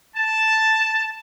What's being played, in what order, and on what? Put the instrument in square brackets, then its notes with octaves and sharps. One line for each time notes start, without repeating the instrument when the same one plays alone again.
[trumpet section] A5